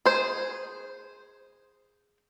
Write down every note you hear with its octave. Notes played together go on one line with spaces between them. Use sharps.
G#4 C5